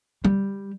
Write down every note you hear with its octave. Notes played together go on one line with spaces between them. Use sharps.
G3